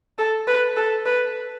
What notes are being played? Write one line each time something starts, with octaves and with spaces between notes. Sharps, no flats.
A4
B4
A4
B4